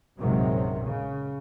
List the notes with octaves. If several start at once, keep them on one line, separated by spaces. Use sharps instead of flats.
A#1 F#2 C3 D#3 F#3 G#3
C#3